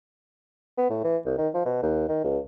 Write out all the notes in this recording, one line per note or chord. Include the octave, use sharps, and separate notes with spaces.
B3
A2
E3
C2
D#3
F3
B2
D#2
D#3
C#2